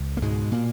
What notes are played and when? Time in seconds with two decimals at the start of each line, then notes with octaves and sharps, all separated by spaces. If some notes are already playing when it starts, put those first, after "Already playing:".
Already playing: C#2
0.17 A#3
0.22 G#2 B2 G#3
0.52 A#2 A#3